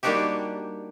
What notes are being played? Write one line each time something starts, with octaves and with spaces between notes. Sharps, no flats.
G3 A#3 D4 D#4 F#4 G4